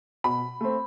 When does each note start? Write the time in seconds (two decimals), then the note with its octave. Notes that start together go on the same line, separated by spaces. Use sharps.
0.24 B2 B5
0.61 A3 C4